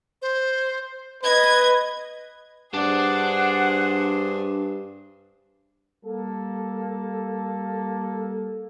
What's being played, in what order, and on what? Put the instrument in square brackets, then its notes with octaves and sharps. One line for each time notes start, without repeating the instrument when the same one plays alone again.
[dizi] C5
[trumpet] B4 [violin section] D#5 G#6
[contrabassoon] G2 [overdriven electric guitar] D4 D5 [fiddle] G#4 C5 [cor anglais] F#5
[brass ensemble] G3 A#3 A4